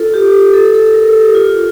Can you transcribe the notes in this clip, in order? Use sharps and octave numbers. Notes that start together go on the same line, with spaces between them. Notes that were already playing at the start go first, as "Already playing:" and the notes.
Already playing: F4 A4
G4
A4
A4
A#4
A4
G4
F4